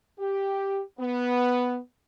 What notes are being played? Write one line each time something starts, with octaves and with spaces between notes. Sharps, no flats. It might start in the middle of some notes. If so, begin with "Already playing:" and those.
G4
B3